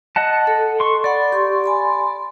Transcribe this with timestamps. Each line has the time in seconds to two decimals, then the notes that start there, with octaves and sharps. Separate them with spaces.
0.16 D#5 F#5 A5
0.47 A4
0.80 C6 C#6
1.04 D5 F#5 B5
1.32 G4 C6 C#6
1.64 G#5 B5 C6